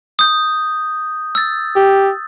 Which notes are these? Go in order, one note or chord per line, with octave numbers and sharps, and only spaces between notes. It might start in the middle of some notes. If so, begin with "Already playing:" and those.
D#6 G6
E6 A6
G4